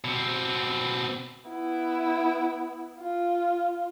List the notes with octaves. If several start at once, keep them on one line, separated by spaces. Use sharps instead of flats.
B2 C4
B3 E4
F4